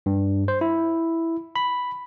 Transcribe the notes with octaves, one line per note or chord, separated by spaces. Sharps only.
G2
C5
E4
B5